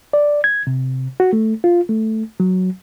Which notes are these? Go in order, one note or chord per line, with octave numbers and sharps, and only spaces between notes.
D5
G#6
C3
F#4
A3
F4
A3
F#3